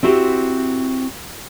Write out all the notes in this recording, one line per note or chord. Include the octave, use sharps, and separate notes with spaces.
C4 E4 F#4 G4 C5